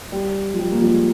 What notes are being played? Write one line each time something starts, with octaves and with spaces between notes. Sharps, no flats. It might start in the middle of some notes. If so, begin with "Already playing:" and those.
G3
F3
G3
A#3
F3 G#3